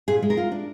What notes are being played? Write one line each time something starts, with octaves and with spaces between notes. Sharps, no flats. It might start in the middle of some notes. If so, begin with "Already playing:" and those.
A#2 G#4
G#3
A#4
F4
D4